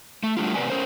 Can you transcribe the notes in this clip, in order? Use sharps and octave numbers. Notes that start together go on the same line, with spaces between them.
A3
G3 A3 D4 F4
A2 C3 B4 D5 G#5
C#4 A#4 C5